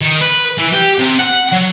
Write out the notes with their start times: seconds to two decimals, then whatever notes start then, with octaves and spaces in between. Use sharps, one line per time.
0.01 D#3
0.21 B4
0.58 E3
0.73 G4
0.99 C3
1.19 F#5
1.52 F#3